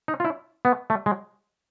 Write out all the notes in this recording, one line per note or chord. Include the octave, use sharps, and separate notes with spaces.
D#4
F4
E4
B3
A3
G#3